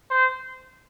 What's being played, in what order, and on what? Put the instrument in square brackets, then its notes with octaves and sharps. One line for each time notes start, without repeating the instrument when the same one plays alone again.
[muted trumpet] C5